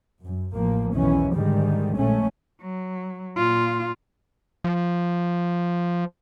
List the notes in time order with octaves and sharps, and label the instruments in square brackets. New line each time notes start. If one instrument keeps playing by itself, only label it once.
[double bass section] F#2
A1 F3 A#3
B1 E2 D#3 E3 C#4
G#2 D3 D#3 G3 G#3
A#1 G#3 A3 C#4
[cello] F#3
A#2 F4
[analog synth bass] F3